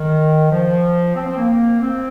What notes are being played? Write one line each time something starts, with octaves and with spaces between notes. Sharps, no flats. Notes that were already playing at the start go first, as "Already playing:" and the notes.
Already playing: D#3
F3
C4
C4
A#3
C4